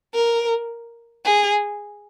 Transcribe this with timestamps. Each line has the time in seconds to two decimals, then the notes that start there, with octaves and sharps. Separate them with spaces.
0.14 A#4
1.25 G#4